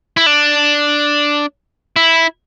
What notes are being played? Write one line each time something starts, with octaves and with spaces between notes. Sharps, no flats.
E4
D4
E4